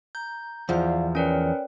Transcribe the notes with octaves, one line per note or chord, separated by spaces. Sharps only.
A#5 G6
E2 F3 D5 F5
C#4 A#4 B4 C#5 D5 G5